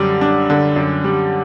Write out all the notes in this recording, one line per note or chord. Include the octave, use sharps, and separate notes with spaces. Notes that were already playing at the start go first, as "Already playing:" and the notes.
Already playing: F#2 D3 G3
D4
D3
F#2
G3